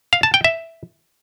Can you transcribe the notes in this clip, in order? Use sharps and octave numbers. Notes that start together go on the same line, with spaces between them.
F5
A5
G5
E5